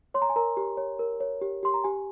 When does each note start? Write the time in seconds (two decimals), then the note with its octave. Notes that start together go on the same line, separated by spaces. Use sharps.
0.14 C#5 C6
0.22 A#5
0.29 G#5
0.36 A#4 A#5
0.57 G4
0.77 C#5
0.99 A#4
1.20 C#5
1.41 G4
1.63 G4 C6
1.74 A#5
1.84 G4 G#5